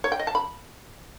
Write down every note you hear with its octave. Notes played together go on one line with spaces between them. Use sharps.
C#5
G5
D#5
A5
B5